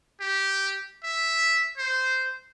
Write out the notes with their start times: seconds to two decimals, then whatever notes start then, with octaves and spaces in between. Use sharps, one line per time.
0.20 G4
1.04 E5
1.78 C5